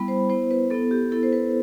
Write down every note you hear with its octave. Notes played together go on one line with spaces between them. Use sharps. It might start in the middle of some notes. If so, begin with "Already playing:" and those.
Already playing: G3 B3 E4 B5
C5
B3 E4 C5
B4
B3 E4 A4
G4
B3 E4 A4
C5
B4